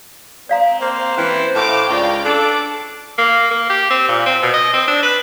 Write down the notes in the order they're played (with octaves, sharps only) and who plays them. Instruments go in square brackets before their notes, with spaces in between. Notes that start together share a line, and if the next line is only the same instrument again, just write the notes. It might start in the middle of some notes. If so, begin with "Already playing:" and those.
[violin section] C4 [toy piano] D5 F5 A#5
[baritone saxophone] A#3 [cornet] C5
[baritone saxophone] E3 [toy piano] C#4
[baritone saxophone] A2 [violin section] F5 D6
[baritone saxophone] C#2 [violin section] D5 F5 G5
[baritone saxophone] D4 [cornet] A4 [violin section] D6
[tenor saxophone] A#3
A#3
G4
C4
A#2
C4
B2
D#5
C4
D4
B4